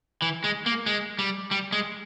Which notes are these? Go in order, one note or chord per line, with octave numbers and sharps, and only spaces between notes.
E3
G#3
A#3
G#3
G3
G3
G#3